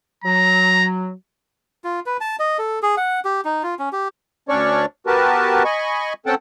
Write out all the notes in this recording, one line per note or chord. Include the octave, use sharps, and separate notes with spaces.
F#3 A#5
F4
B4
A5
D#5
A4
G#4
F#5
G4
D#4
F4
C#4
G4
D2 C#4 D4 C#5 D5 C#6
B3 F#4 G4 A#4 B4 A5
D#5 G#5 B5 C#6
C4 C#4 A4 F#5 G5 A5